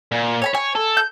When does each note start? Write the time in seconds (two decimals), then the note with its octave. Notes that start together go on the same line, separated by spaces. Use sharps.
0.12 A#2
0.42 C#5 G#5 B5
0.55 C#5 G#5
0.76 A4
0.97 G6